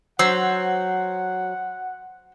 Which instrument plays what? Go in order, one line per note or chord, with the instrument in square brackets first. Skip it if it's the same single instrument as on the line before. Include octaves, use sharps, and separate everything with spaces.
[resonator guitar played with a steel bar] F#3 [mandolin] C5 E6 [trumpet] F#5